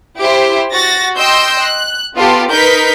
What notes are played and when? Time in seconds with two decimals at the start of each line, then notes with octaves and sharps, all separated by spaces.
0.20 E4 G4 C5
0.73 F#4 A6 A#6
1.16 D#5 G5 C6 E6 G6
1.62 F#6
2.16 B3 F4 G4 A4
2.50 D#4 A#4 B4 G6 B6